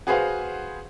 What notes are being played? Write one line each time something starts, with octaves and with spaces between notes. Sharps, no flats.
F#4 G#4 B4 C5 F5 F#5